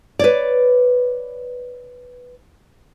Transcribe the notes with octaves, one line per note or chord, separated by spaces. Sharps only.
B4 C#5 D5